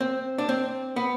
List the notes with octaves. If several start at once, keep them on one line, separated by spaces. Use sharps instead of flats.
C4
D4
C4
B3